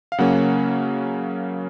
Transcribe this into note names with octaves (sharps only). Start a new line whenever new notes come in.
F5
C#3 F#3 A#3 C#4 F#5